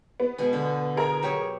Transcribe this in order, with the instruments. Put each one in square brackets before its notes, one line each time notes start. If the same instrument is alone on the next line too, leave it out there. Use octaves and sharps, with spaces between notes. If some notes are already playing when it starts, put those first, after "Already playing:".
[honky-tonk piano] B3
[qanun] B2 G#3 G#5
D3
[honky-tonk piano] G#4 A#4 A#5
[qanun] F#3 G4 C#5